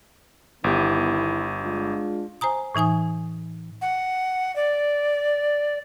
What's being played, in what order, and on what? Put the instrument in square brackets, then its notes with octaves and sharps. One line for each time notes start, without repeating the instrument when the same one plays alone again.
[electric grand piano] G1 G4 [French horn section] D#3 B3 E4
[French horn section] G#3 D4 F4
[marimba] C5 G#5 A#5 D#6
A2 E3 D#4 G#5 D#6
[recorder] F#5
D5